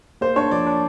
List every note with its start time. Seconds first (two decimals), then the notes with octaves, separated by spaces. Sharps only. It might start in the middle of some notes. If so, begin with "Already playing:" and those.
0.21 A#3 C5
0.36 D4 C#5
0.51 F3 D5
0.67 D4